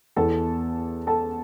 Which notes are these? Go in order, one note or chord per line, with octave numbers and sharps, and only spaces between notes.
E2 E3 A4 A5
A4 A5